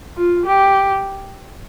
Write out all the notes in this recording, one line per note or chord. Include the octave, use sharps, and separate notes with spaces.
F4
G4